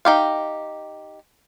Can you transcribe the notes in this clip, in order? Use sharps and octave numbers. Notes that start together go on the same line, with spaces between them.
D#4 G4 F5